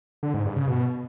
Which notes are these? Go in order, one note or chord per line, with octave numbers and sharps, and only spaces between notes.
D3
G#2
G2
C#3
B2